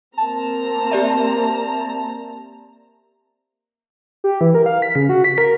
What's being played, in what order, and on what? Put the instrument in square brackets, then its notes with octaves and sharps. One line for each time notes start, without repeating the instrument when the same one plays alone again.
[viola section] A#3 C4 A#5 [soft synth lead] A5
[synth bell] G4 D5 E5
[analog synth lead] G4
E3
A#4
F5
B6
C#3
F#4
B6
A#4